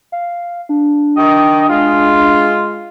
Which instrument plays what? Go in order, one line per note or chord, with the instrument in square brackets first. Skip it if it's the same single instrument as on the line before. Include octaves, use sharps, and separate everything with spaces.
[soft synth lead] F5
D4
[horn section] D#3 G4 D#5
G#3 F4